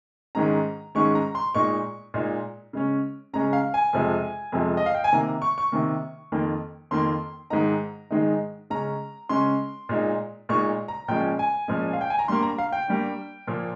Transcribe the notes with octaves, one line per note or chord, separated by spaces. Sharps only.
G#2 D#3 G#3 C#4 A#5
G#2 D#3 G#3 C#4 C#6
A#5
C6
A#2 G#3 D#4 C#6
A#2 G#3 D#4
C#3 G#3 C#4
C#3 G#3 C#4 A#5
F5
G#5
F2 C3 F3 G#3
F2 C3 F3 G#3
D#5
F5
G5
G#5
C3 D#3 A#3 A#5
C#6
C#6
C3 D#3 A#3
F2 D#3 A#3
F2 D#3 A#3 C6
G#2 D#3 G#3 D#4 A#5
G#2 D#3 G#3 D#4
C#3 G#3 C#4 A#5
C#3 G#3 C#4 C6
A#2 G#3 D#4
A#2 G#3 D#4 C#6
A#5
A#2 F3 G#3 C#4 G5
G#5
A#2 F3 G#3 C#4
F5
G5
G#5
A#5
G2 G3 A#3 C6
A#5
F5
G5
G2 G3 A#3
A#2 F3 A#3